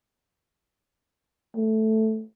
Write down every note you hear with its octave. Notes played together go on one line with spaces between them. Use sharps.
A3